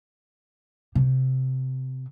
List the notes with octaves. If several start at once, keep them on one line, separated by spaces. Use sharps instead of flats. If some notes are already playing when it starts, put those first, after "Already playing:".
C3